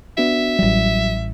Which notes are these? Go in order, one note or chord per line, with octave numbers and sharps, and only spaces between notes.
B3 D4 F#4 E5
A1 F#3 G3